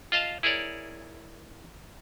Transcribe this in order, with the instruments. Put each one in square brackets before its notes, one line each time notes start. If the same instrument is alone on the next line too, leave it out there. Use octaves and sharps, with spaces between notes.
[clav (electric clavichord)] F4 D#5 F5 A5
E4 G#4 A#4 C#5 D5